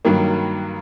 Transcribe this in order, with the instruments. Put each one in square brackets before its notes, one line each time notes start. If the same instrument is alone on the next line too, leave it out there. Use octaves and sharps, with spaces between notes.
[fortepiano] G2 D#3 F#3 A#3